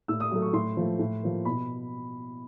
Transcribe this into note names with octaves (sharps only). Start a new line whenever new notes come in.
A2 E6
D#6
F#3 A3
C#6
A2 C6
F3 A3
A2
F3 A#3
B2 B5